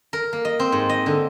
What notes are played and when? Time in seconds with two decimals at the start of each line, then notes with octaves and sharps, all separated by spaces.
0.13 A#4
0.33 A#3
0.45 D#5
0.59 C4
0.72 G#2
0.89 D#5
1.06 D3